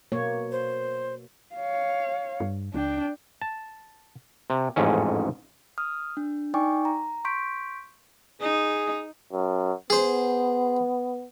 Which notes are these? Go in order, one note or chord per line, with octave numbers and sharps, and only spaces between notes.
B2 A#3 C#5
C5
C#5 F5
G2
C#2 D4 G5
A5
C3
A1 F2 G#2 C#4
D#6 F6
D4
D#4 D5 G5 G#5 C#6 D6
A#5
C6 C#6 G6 B6 D7
D#4 G#4
F#2
B3 G#4 C5